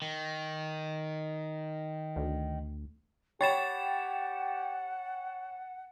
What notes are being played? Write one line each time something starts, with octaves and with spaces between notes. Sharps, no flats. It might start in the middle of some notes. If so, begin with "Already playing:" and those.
D#3
D2
G4 C#5 F#5 G5 B5 A6 E7